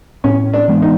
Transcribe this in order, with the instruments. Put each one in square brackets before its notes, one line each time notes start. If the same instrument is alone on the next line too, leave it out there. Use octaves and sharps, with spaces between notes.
[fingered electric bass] A2 [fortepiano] C#4
[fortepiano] D4
[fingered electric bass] E3 G#3 B3
[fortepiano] D#4